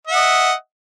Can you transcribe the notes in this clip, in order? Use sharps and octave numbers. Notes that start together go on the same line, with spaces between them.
D#5 E5 F#5